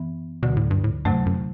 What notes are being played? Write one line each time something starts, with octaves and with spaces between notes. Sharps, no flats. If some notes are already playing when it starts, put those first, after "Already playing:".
Already playing: F#2 E3 B3
D2 B2 D3 F#3
A2
G2
A2
E2 G2 C3 F#3 A3
F#2